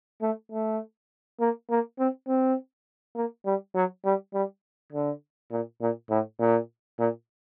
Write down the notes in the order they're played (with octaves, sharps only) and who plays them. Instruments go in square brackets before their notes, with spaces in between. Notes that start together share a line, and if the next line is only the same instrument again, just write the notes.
[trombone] A3
A3
A#3
A#3
C4
C4
A#3
G3
F#3
G3
G3
D3
A#2
A#2
A2
A#2
A#2